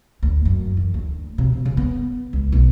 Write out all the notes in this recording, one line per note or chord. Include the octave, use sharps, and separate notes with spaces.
D2
F#2
E3
D2
C3
B2
C#3
B3
C#2
B1